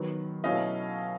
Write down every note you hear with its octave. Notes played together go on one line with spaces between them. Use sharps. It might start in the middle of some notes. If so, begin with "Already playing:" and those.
Already playing: D#3 F#3 B3
B2 F#3 A3 C#4 E4 D#5 F5